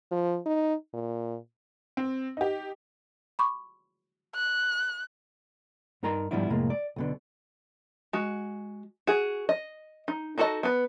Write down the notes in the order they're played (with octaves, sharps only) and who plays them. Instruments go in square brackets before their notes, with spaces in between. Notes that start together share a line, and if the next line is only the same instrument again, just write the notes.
[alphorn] F3
D#4
A#2
[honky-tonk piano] C4
D#4 G4
[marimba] B5 C#6 D6
[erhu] F#6
[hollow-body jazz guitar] G2 D#4 A#4 A#5 C6
G#2 F3 G3 B3 D4 E4
F2 A2 C3 G#3 A#3
D5
B1 B2 D3
[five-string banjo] G#3 F#4
F#4 G#4
D#5
D#4
D#4 F#4 A4 A#4 D#5
B3 B4